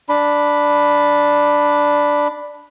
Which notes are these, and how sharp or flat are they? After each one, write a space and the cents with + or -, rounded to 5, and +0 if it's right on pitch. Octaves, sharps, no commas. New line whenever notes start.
D4 +0 B5 +0